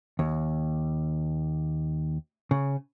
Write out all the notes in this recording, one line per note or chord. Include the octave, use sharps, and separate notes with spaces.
D#2
C#3